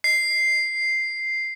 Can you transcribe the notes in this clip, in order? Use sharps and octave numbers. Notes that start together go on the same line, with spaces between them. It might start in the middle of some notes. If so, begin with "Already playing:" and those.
C7